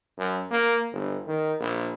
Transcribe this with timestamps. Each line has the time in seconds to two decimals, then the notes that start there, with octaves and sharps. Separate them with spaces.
0.18 F#2
0.51 A#3
0.92 G1
1.27 D#3
1.60 A#1